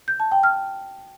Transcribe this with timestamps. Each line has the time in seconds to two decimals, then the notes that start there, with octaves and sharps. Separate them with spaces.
0.08 G6
0.20 A5
0.32 G5
0.43 F6